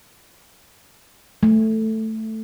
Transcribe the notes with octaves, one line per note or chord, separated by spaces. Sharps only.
A3